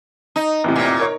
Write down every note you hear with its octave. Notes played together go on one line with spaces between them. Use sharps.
D#4
E2 A2 C3
A#2
A#4 C#5